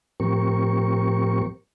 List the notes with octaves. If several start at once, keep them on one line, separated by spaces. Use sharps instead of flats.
A2 F3 C4 G4 A#4 C#6